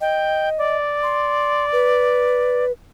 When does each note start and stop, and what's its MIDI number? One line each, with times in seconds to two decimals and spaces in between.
0.01 0.77 75
0.01 0.49 79
0.58 2.65 74
1.03 1.65 84
1.72 2.72 71